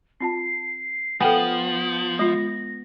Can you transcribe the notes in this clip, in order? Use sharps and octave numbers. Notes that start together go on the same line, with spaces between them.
C4 F4 A5 C7
F3 B3 A4 G5 G#5 F#7
G#3 F4 A#6